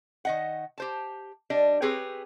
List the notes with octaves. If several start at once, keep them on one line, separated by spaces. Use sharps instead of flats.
D#3 D#5 F#5
G4 C5 A5
G3 D4 D#5
C4 G4 G#4 B4 C#5